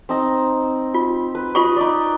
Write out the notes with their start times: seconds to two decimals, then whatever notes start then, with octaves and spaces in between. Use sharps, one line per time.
0.09 C4 D#4 A#5
0.94 F4
1.35 B4
1.55 F4 B4 D#5 C6 C#6
1.76 D#4 D5